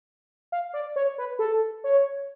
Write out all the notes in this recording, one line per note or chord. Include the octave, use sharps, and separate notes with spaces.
F5
D5
C#5
B4
A4
C#5